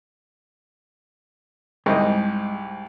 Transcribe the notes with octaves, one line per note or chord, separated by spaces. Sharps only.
C2 G#2 G#3 D#5